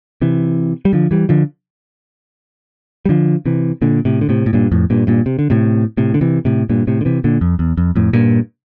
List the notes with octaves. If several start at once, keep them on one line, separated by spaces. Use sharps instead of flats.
C3 E3
G3
D3 F3
E3 G3
D3 F3
G3
D3 F3
C3 E3
A#2 D3
A2 C3
D3
A2 C3
A2
G2 A#2
F2 A2
G2 A#2
G2 A#2
C3
D3
A2 C3
A2 C3
D3
C3 E3
A2 C3
G2 A#2
A2 C3
D3
C3 E3
A#2 D3
F2
E2
F2
F2 A2
G2 A#2